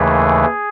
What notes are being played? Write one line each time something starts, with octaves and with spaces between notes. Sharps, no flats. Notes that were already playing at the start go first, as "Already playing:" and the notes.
Already playing: D#2 C#3 E3 A3 G#4